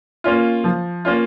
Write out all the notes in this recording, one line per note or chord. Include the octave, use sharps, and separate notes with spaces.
A#3 C#4 F4
F3
A#3 C#4 F4